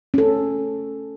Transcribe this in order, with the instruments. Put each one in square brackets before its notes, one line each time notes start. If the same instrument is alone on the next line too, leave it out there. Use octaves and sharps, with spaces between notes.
[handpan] C#4 A4